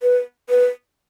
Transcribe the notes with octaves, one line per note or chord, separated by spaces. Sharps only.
B4
B4